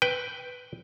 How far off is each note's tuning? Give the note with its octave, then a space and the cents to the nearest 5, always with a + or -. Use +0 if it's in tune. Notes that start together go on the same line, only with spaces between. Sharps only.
B4 +10 G5 +0